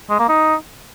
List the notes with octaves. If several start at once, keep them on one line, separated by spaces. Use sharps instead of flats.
G#3
A#3
D#4